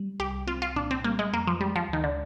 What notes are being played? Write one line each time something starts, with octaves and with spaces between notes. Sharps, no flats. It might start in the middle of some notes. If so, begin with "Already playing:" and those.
Already playing: G3
C2 G4
C4 F4
F4
A#2 D4
C4
G3 A#3
G#3
F2 A#3
F3
G3 G#3
F3
D2 D#3
D3